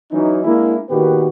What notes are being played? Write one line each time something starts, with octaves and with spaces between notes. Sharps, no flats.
E3 F#3 C#4 D#4
G#3 A#3 D4 E4
A#2 D#3 B3 F#4 G4 B4